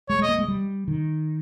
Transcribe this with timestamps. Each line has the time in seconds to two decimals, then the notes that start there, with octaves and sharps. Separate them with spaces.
0.09 G#3 C#5
0.19 G#3 D#5
0.29 A#3
0.39 G#3
0.48 G3
0.88 D#3